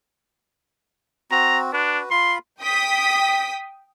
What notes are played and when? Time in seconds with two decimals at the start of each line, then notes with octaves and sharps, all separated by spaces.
1.31 C4 F#4 A#5
1.73 D4 F#4 B4
2.11 F4 B5 C6
2.61 G5 D#6 B6